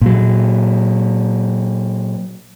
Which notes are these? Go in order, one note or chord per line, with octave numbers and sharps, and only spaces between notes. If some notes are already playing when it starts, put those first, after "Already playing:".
A#2 F#3